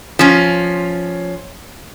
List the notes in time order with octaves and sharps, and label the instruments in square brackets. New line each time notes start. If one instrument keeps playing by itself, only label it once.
[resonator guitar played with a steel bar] F3 C#4